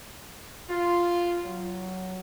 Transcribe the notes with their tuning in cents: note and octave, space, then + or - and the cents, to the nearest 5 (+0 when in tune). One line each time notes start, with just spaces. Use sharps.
F4 -5
F#3 +10